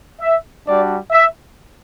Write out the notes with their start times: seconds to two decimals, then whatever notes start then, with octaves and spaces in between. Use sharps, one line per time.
0.21 E5
0.66 G3 D4 F#4 D5
1.12 E5